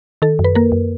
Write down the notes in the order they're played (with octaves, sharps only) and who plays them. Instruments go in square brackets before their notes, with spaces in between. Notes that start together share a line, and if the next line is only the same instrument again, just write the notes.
[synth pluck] D#3 A4
F#2
B4
A#3 A#4
F#2